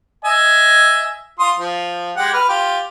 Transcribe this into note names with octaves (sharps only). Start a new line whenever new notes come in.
D#5 E5 G#5
F4 C6 D#6
F3
G#3 G4 F#5
B4 F6
F4 G4